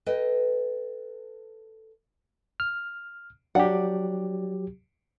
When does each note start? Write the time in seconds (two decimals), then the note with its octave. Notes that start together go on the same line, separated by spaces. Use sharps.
0.06 A4 B4 D#5 G5
2.60 F6
3.55 F#3 D4 G4 F#5